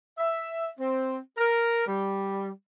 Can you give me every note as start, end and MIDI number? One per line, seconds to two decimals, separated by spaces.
0.18 0.69 76
0.80 1.17 60
1.38 1.86 70
1.87 2.50 55